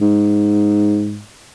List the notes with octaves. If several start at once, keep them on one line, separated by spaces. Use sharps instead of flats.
G#2